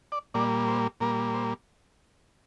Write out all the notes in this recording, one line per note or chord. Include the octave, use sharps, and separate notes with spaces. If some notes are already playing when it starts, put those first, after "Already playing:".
D5
A#2 G3 A#3 D5
C5
A#2 G3 A#3 A#4
C5